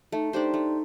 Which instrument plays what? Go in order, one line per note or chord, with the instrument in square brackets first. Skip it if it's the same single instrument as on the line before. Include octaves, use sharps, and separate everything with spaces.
[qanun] A3 [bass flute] D#4
[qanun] D4 G4 C5 [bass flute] D#4
[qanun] A3